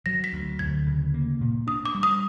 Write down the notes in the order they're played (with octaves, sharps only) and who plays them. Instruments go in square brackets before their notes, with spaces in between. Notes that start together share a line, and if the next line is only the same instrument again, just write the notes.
[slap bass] F#3 [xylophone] A#6
[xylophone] B6
[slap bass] D2
[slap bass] D2 [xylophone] G#6
[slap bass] C#3
A#3
A#2
[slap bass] D4 [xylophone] D#6
[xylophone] D6
[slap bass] G3
[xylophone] D#6